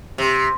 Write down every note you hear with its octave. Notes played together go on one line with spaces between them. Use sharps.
C3